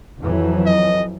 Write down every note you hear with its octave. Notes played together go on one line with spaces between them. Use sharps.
F2 E3 F#3
D#5